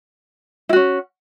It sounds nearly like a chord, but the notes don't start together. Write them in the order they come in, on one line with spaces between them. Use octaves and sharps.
E4 F#4 C#4